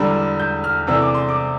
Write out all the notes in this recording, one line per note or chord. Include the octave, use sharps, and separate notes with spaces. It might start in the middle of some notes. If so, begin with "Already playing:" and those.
Already playing: E1 E2 D3 G3 D4
G6
F6
E2 C3 E3 A3 D4 E6
D6
C6
D6